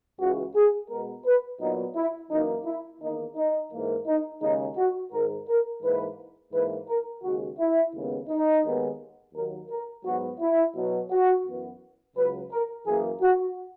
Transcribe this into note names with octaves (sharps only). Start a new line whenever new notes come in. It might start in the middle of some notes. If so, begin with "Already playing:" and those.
C#2 C#3 E3 F#4
G#4
B2 G#3 B3 A#4
B4
A#2 F#3 B3 D#4
E4
F#2 E3 A#3 D#4
E4
E2 D#3 A#3 D#4
D#4
G#2 E3 A#3
D#4
D#2 C#3 G#3 D#4
F#4
G#2 D#3 G#3 A#4
A#4
G#2 E3 A#3 B4
G#2 E3 A#3 B4
A#4
D#2 C#3 G#3 F#4
E4
D#2 C#3 G#3 B3
D#4
D#2 D#3 G#3 B3
D#2 D#3 F#3 A#3 A#4
A#4
G#2 F#3 B3 F#4
E4
B2 F#3 B3
F#4
F#2 E3 B3
C#2 C#3 F#3 B4
A#4
F#2 E3 A#3 G#4
F#4